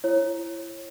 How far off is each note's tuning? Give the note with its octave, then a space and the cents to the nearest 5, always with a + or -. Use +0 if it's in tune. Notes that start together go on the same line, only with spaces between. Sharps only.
E4 +30 C#5 -25